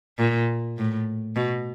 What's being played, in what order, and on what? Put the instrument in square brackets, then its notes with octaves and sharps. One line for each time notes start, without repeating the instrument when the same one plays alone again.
[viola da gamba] A#2
A2
B2